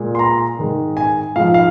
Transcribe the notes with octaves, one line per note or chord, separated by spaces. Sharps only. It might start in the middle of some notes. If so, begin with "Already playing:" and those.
Already playing: A#2 G#3
C6
A#5
G#2 D#3 G#3
G#5
G#2 F3 G#3 F5
F5